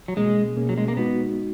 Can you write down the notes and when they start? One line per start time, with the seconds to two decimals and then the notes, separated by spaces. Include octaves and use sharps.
0.08 F#3
0.17 B2 G#3 A#3 C#4 G#4
0.56 B2 A#3 C#4 G#4
0.69 F#3
0.78 G#3
0.88 A#3
0.97 G#3 B3 D#4 F#4